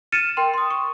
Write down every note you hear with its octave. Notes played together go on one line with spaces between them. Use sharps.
F6 A6 C#7 D#7 E7
A#4 G5 C6
C6 D#6
C#6